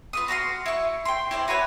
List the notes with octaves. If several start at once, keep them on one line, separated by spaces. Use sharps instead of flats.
F4 B4 D#6
F#4 F5 A#5 C6
E4 C#6
G5 C6
E4 C5 D5
F#4 B4 C#5 G#5